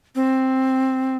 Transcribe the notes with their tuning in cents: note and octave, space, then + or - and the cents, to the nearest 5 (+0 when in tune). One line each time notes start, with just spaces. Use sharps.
C4 +5